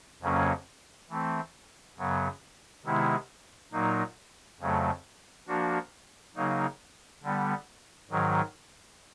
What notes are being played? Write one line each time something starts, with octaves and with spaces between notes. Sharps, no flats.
F2 C#3 F#3 A#3 C#4
E3 A3 C4
F#2 C#3 F#3 B3
C3 D#3 G#3 B3 E4
A#2 F#3 A#3 D#4
F2 C#3 F#3 A3
F3 A#3 D4 F#4
C#3 F#3 A#3 D#4
D3 G3 B3
G#2 D#3 F#3